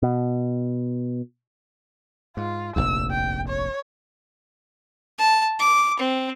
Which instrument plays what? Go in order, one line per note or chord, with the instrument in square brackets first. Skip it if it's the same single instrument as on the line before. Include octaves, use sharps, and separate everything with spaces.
[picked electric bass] B2
[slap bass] G#2 [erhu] F4
[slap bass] F1 A#1 D#2 [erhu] E6
[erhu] G5
C#5
[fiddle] A5
D6
C4